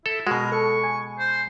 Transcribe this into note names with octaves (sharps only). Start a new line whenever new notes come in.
E4 A4
B2 G#3 F#4 A#4
A4 A5 C#6
G#5
C5